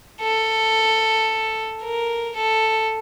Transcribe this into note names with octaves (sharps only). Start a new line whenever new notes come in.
A4
A#4
A4